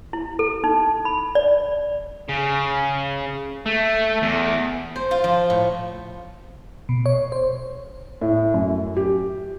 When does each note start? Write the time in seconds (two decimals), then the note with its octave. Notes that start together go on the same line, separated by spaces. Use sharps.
0.13 E4
0.39 A4
0.64 D#4
1.05 B5
1.35 D5
2.29 C#3
3.66 A3
4.22 E2
4.96 C5
5.11 F4
5.24 F3
5.50 A2
6.89 B2
7.06 C#5
7.32 C5
8.21 A2
8.54 F#2
8.96 G4